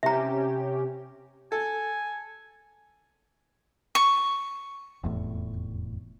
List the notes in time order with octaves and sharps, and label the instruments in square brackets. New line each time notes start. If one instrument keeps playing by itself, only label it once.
[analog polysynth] C3 C#4 G4 [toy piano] E5 A#5
[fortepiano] A4 [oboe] G#5
[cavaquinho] C#6
[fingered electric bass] F1 E2 A2